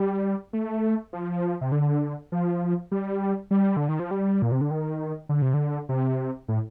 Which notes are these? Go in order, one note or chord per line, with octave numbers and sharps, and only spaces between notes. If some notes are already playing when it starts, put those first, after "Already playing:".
Already playing: G3
A3
F3
C3
D3
F3
G3
G3
D3
D#3
F3
G3
A#2
C3
D3
D#3
D3
C3
D3
C3
A2